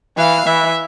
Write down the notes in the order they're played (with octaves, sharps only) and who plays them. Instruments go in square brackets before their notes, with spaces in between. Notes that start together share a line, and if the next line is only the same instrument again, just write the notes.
[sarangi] E3 [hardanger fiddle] F5
[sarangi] E3 [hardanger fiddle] E5